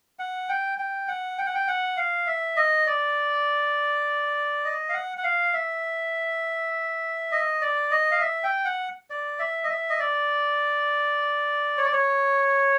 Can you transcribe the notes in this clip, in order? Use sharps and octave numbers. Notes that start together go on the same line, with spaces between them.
F#5
G5
G5
F#5
G5
F#5
G5
F#5
F5
E5
D#5
D5
D#5
F5
F#5
F#5
F5
E5
D#5
D5
D#5
F5
E5
G5
F#5
D5
E5
D#5
E5
D#5
D5
C#5
D5
C#5